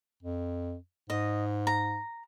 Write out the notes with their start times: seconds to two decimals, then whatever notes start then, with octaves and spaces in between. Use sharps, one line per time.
0.23 F2
1.10 G#2 D#5
1.67 A#5